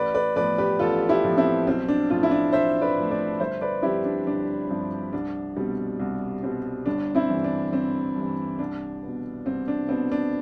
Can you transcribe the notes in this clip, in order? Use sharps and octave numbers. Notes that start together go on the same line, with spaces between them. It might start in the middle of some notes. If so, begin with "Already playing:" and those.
Already playing: A1 B4 D5
B4 D5
A2 F3 B3 B4 D5
G4 B4
A1 F4 A4
E4 G4
A2 F3 B3
C4 E4
B1 C4
D4
A2 F3 A3 D4 F4
E4
D4 F4
B1 C5 E5
B4 D5
A2 F3 A3
B4 D5
G1 C5 E5
B4 D5
G2 F3 C4 E4 G4
D4
G1 D4
G2 F3 C4
C2 D4
B2 G3 C4
C2
B2 G3 C4
G1 D4
C4 E4
G2 E3
D4
G1 C4
G2 E3
C2 D4
B2 B3
C2 C4
D4
B2 B3 C4
D4